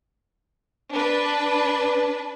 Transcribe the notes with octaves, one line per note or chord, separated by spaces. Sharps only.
D4 B4